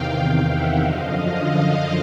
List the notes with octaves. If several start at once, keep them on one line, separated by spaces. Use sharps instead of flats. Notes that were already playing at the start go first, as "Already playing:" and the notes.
Already playing: E2 C3 D#3 F5 G5
F5 G5
E5 F#5
F#2 D3 F3 D#5 F5